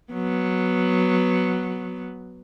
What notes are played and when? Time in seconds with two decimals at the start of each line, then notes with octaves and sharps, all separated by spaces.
0.13 F#3 B3